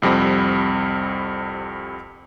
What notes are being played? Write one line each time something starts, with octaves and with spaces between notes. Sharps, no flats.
C2 F2 G3 C4 B5